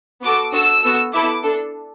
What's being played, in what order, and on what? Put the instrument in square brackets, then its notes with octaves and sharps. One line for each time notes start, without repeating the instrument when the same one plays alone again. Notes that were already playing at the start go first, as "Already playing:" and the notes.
[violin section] B3 F#4 A4 D6
D4 F#4 A4 E6
B3 F#4 A4
B3 E4 A4 D6
D4 A4